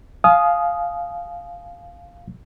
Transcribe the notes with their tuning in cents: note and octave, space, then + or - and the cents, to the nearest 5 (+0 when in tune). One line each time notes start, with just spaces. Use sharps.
F5 +0 G#5 +40 D#6 +0